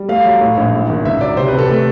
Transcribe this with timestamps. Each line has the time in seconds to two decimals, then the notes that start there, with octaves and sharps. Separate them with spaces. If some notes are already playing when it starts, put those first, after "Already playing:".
Already playing: G3
0.09 A3 F5
0.25 F#3
0.41 A2
0.57 A#1
0.73 G#2
0.89 G#1
1.05 C#2 E5
1.21 F#3 D5
1.37 C3 C5
1.48 B4
1.53 C3
1.59 A4
1.69 A3 A4